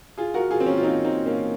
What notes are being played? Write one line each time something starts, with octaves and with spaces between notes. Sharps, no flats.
F4 G#4
F#4 A#4
F4 G#4
C4
A#3 C#4
F4
C4 D#4
C4 D#4
A#3 C#4